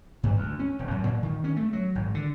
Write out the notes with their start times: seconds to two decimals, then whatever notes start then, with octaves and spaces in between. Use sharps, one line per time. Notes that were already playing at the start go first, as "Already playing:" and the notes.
0.23 G2
0.37 D2
0.59 C#4
0.79 E1
0.91 F#2
1.07 A#2
1.23 D#3
1.44 C#4
1.56 A3
1.73 F#3
1.95 G#1
2.14 D3